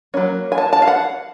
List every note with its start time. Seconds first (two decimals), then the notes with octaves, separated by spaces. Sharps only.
0.14 F#3 A#3 C#4
0.52 G#5
0.58 A5
0.73 A5
0.82 F5
0.87 F#5